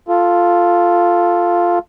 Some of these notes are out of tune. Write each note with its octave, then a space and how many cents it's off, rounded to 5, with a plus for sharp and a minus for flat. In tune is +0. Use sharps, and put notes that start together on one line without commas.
F4 +0 A4 +0